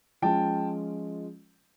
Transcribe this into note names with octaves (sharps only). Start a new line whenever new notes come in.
F3 G#3 C#4 F4 G5 A5